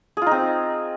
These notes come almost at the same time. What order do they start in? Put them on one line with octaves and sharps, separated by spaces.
G#4 F4 D#4 C4